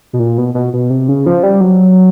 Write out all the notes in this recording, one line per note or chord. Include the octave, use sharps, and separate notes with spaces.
B2
A#2
B2
B2
B2
C3
C#3
F3
G3
F#3